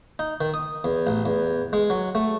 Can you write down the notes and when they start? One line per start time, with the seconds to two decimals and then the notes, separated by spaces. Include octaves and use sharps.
0.19 D#4
0.41 D#3
0.54 D#6
0.84 E2
1.07 A1
1.26 E2
1.73 G#3
1.90 F#3
2.15 A3